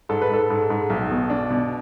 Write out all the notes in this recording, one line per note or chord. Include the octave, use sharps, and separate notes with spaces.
G#2 A4
B4
G#2 A4
G#2
G#2
B1
B2
D4
B2